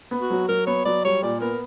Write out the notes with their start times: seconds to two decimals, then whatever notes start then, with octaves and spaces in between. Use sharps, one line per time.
0.11 B3
0.20 F#4
0.30 F#3
0.49 F#3 A#4
0.67 B3 C#5
0.85 F#3 D5
1.05 G3 C#5
1.22 A#2 D5
1.41 B3 A#4